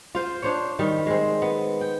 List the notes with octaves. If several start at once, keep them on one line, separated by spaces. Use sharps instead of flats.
F4 C5
D4 C5 C#5
D#3 G3
G#3 C4
B3
G5